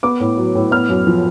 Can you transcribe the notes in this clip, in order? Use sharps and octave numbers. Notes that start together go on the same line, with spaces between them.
B3 D6
A2
F#3
A2
B3 F6
F#2
F3